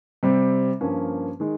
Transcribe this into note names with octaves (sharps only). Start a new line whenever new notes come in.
C3 G3 C4
G2 F3 A#3 C#4
D#3 G#3